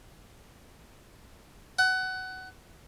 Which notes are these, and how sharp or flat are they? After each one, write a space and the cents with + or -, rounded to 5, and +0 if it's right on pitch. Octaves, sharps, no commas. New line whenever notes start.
F#5 +20